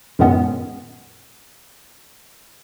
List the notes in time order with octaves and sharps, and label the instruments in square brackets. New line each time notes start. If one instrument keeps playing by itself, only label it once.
[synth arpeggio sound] F#2 A#2 D#3 G#3 B3 C#4